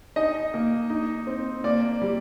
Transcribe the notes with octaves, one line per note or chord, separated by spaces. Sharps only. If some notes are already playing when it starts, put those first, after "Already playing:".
D#4 D#5
A#3
D#4
C4
A#3 D5
G3